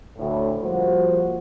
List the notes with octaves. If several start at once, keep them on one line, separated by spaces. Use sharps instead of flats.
D2 A2
F3 G3 A#3 F4 F#4 C5